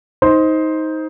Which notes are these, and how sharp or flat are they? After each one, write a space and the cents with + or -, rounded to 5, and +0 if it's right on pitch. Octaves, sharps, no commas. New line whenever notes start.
D#4 +20 C5 +0 C6 +0